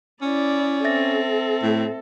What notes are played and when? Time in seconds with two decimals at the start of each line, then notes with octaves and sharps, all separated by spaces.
0.22 C#4 E4 D5
0.84 C4 A4 E5 A6 A#6
1.63 A2